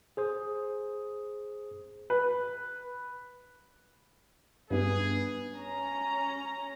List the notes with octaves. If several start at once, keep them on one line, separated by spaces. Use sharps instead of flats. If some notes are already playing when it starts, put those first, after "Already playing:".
G#4 C5 D#6
B4
G2 G3 B3 G#4
C#4 A#5